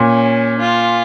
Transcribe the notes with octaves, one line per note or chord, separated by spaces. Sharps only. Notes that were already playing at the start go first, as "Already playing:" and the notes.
Already playing: A#2 C#4
F4